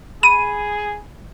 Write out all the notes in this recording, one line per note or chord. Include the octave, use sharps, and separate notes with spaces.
G#4 B5 D#7